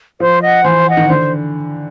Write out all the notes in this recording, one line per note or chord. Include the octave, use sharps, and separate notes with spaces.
F3 C5
D#5 F#5
E3 C5
D#5 F#5
D#3
D3 C5